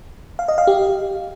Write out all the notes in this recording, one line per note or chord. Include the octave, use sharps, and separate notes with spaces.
F5
D#5
F5
G4